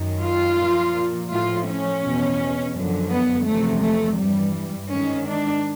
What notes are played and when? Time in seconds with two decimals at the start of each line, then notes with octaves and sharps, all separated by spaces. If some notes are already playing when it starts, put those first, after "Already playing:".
Already playing: F#2 D#3
0.22 F4
0.59 A#2 F3
1.30 A2 F3 F4
1.67 C#4
2.02 E2 B2
2.74 F#2 D3 F3
3.11 B3
3.46 E2 C3 F3 A3
3.82 A3
4.18 G2 E3 G3
4.90 G#2 D#3 C#4
5.27 D4